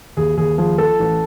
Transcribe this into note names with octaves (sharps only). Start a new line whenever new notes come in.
D#2 G#4
D#2 G#4
F3 G#4
F3 A4
A1